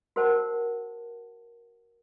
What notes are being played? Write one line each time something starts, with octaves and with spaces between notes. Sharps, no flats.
F#4 A#4 C5 F#5 A5